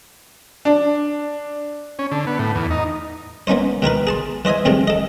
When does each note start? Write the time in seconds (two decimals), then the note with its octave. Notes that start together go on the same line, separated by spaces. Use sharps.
0.65 D4
1.99 C#4
2.11 D3
2.27 B3
2.39 A2
2.55 E2
2.71 D#4
3.47 A#3 B3 C#4 D#4 C5
3.82 B2 D#3 A#4 B4
4.07 G#4 A5 C6
4.45 E3 C5 D#5 E5 G#5
4.65 F2 A2 D#3 G3 G#3 C4
4.88 A4 D#5